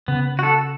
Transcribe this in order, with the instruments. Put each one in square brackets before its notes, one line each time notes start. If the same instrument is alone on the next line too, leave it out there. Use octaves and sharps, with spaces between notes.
[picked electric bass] C#3 [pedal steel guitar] B3
[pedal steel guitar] F#4 A4